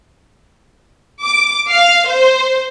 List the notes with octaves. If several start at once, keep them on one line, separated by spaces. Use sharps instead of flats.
D6
F5
C5